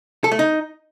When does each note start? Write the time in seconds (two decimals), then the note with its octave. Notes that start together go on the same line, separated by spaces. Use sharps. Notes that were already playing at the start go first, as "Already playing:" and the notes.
0.24 A4
0.32 A3
0.39 D#4